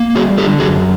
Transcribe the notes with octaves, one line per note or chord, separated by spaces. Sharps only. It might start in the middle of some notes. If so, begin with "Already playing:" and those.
Already playing: A#3
G3 F#4 G#4
D3 G4 A4
F#2 F#4 G#4